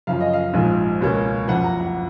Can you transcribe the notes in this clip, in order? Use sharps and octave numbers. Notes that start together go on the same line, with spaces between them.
F#2 C#3 F3 F5
D#5
F5
A#1 G#2 F3
C#2 B2 A#3 C#4
F#1 F2 F3 F#5
A#5
F#5